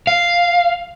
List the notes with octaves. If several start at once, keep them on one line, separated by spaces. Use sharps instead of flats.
F5